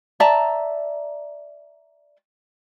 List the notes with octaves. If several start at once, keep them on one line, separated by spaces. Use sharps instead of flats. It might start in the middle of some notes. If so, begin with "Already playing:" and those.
D5 E5 A5 A#5